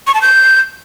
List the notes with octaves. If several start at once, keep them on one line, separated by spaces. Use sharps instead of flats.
C#6
A5
G6